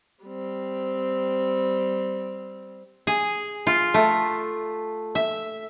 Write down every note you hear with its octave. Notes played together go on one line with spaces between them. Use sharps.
G3 C4
G#4
F4
A3
E5